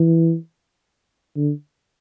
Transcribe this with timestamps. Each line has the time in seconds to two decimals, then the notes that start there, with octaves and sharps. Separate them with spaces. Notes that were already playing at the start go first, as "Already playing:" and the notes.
Already playing: E3
1.36 D3